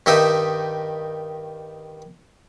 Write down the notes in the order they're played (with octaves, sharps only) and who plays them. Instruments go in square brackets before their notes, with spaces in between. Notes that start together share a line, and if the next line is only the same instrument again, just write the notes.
[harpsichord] G2 D#3 D#4 G4 E5 D#6